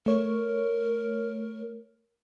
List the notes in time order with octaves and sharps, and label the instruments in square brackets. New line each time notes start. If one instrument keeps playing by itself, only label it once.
[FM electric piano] A3 C#5 [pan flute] A#4